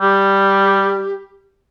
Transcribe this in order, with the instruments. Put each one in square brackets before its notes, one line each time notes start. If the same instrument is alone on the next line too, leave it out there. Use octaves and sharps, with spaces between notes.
[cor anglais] G3 [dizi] G4